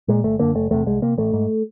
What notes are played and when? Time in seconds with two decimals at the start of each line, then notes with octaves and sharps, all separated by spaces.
0.08 A#2 G#3
0.24 G1 A3
0.39 F#2 D3 A#3
0.55 F#1 A3
0.71 E2 C3 A3
0.86 C2 G#3
1.02 C3 A#3
1.18 A1 A3
1.33 G#2